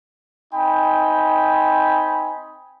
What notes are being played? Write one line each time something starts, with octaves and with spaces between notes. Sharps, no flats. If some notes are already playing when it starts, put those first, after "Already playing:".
C4 D#4 G5 G#5 B5